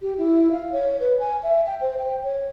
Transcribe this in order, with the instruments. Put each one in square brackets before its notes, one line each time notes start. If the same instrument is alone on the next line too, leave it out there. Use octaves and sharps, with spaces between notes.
[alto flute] G4
E4
F5
C#5
B4
G#5
E5
G5
C5
G5
C#5